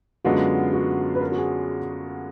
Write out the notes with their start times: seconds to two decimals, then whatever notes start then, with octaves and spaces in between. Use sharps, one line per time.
0.25 F#2 D3 G#3 B3 F4 F#4
0.73 F#4
1.15 B4
1.21 A#4
1.32 F#4
1.38 G#4